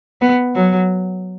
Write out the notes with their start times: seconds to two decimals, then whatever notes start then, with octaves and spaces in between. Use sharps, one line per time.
0.21 B3
0.55 F#3